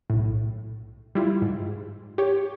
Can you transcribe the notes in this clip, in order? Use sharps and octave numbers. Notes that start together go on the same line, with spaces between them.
B1 A2
G3 E4 F4
G#2
G4 C#5